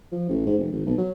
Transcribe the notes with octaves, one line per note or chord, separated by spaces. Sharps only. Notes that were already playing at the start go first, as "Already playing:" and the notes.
F3
A1
G#2
F1
G#1
B1
F#3